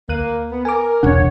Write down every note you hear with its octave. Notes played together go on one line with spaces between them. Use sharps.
D2 A#3 F#6 D#7
B3
A#4 G#5 D6
E1 C2 D4 C#5 F#5